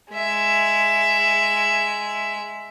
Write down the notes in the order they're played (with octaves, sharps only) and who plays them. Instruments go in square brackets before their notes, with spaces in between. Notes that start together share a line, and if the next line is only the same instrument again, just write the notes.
[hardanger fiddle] G#3 E5